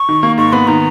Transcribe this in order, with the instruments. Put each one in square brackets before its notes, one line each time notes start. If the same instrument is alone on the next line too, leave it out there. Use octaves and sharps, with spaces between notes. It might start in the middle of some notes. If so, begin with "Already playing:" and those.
Already playing: [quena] C#6
[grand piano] D#3
A#3
[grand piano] G#2 [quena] C#6
[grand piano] B3 [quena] B5
[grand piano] D#3 [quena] A#5